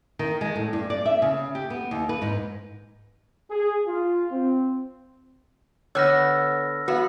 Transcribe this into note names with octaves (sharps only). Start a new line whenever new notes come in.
D#3
G#3
A2
G2
D5
E5
C#3
G4
B3
D#2
B4
G#2
G#4
F4
C4
D3 B3 C#5 F#5 E6 F6 A#6
B3 F#4 B4 F5